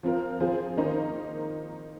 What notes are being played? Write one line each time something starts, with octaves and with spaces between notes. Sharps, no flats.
F3 C4 F4 A#4
F3 C4 F4 G#4 C5
D#3 A#3 D#4 C5